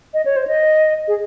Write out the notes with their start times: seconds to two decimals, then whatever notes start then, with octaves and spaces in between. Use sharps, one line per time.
0.14 D#5
0.25 C#5
0.36 C5
0.47 D#5
1.08 G#4